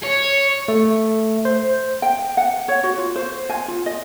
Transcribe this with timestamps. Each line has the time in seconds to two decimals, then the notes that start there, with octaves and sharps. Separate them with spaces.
0.03 C#5
0.68 A3
1.45 C5
2.02 G5
2.37 F#5
2.68 C#5
2.83 F#4
2.98 F4
3.16 C5
3.50 G#5
3.68 F4
3.86 D#5